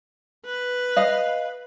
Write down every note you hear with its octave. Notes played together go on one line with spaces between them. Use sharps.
B4
D#5 F5